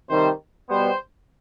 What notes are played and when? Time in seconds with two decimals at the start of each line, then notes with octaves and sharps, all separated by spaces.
0.10 C3 D#3 G3 C5
0.69 B2 G3 B3 C5